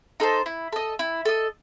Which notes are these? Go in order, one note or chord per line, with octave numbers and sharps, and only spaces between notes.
D#4 A4 C5
E4
A4 D#5
E4
A4 D#5